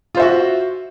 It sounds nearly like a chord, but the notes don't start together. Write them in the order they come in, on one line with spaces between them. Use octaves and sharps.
F4 C5 E5 F#4